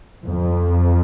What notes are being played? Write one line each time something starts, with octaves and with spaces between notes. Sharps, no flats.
F2